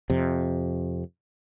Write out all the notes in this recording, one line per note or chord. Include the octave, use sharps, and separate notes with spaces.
F2 C3